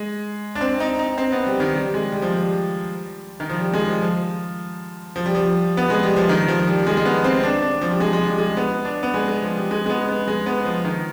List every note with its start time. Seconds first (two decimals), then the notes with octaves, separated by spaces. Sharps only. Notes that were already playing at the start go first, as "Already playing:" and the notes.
Already playing: G#3
0.55 D4
0.61 C4
0.80 D#4
0.99 D#4
1.18 C4
1.32 B3
1.46 G3
1.60 D#3
1.74 G3
1.94 G#3
2.12 G3
2.22 F3
2.32 G3
3.40 D#3
3.50 F3
3.59 G3
3.73 G#3
3.88 F3
4.02 F3
5.16 F3
5.26 G3
5.35 F3
5.77 B3
5.90 G#3
6.03 G3
6.16 F3
6.29 D#3
6.48 F3
6.67 G3
6.87 G#3
6.97 G#3
7.05 B3
7.24 C4
7.43 D4
7.62 D4
7.81 F3
7.91 G3
8.00 G#3
8.13 G#3
8.19 G3
8.38 G#3
8.57 B3
8.85 D4
9.03 B3
9.14 G#3
9.28 G#3
9.42 F3
9.57 G3
9.71 G#3
9.86 G#3
9.90 B3
10.08 B3
10.28 G#3
10.46 B3
10.65 F3
10.85 D#3